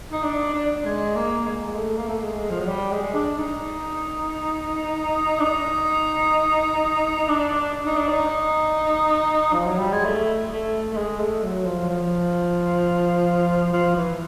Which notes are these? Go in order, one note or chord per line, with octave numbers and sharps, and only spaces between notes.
D#4
D4
D4
G#3
A#3
G#3
G#3
A3
A#3
A3
G#3
F3
F#3
G3
G#3
D4
D#4
D4
D#4
D4
D#4
D4
D#4
F3
F#3
G3
G#3
A3
A3
A3
G#3
A3
F#3
F3
F3
F3
E3